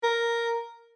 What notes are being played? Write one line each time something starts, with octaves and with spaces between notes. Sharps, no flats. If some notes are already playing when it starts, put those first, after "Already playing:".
A#4